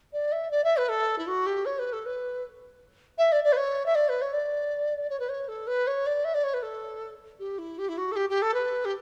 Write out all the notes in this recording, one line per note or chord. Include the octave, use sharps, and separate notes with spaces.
D5
E5
D5
E5
B4
A4
E4
F#4
G4
C#5
B4
A4
B4
E5
D5
D5
B4
C#5
E5
D5
B4
C#5
D5
C#5
B4
C#5
A4
B4
C#5
D5
E5
D5
C#5
B4
A4
G4
E4
G4
E4
F#4
A4
G4
G4
A4
B4
G4